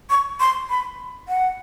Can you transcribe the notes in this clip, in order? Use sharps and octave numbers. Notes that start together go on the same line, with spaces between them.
C#6
C6
B5
F#5